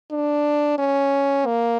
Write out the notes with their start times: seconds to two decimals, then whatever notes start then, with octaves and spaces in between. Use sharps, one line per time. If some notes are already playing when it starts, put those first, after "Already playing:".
0.11 D4
0.78 C#4
1.46 A#3